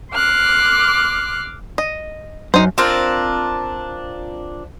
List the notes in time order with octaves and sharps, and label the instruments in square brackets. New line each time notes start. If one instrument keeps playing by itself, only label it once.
[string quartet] C6 D6 F6 F#6
[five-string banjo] D#5
[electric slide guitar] F#2 [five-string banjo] D#4 C5
[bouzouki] C4 D4 F4 A#4